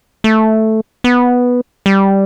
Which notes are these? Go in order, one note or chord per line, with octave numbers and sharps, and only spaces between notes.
A3
B3
G3